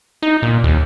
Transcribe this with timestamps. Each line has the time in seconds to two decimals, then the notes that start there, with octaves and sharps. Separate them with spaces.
0.22 D#4
0.42 A#2
0.64 D#2